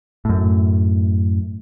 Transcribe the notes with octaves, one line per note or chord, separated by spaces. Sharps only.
F#2 A2